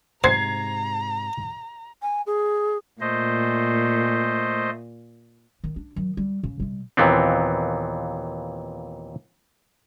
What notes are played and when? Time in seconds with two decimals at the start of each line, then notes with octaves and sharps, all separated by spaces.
0.24 G#2 C3 C5 A#5 G#6 C7
2.01 G#5
2.26 G#4
3.00 A#2 A3 C5 D#5
5.64 D#3
5.76 D4
5.96 D#3 F#3
6.17 G3
6.43 C#3
6.60 C3 G3
6.97 D#2 A#2 E3 B3 C4